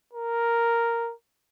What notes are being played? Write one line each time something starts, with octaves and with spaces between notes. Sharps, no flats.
A#4